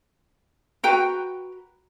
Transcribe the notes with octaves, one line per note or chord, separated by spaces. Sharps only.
F#4 B4 G5 A#5